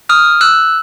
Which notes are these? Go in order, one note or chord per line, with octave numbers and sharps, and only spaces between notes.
D#6 F6
E6 F#6